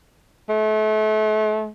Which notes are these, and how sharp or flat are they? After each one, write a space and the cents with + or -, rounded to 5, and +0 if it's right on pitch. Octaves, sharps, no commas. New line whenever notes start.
A3 -35